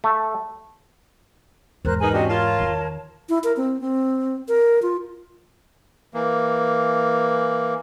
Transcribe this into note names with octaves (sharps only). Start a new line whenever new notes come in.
A3
E2 G#2 A#4 C5 F#6
D#4 G#4 A#4 B4 G#5
C3 C#4 D4 F#4 D#5
F4 A#4 C#5 A5
E2 D#3
E4
A#4
C4
C4
A#4
F4
E3 A#3